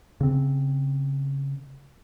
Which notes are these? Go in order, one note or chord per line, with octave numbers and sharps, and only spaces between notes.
C#3 C4